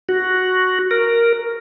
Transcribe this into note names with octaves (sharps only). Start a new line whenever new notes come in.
F#4
A#4